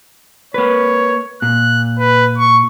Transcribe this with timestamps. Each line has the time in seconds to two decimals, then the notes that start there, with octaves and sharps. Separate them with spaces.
0.54 A#3 B4 C#5
1.42 A#2 F#6
1.99 B4
2.38 C#6